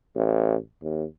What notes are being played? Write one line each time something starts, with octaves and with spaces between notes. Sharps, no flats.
A1
D#2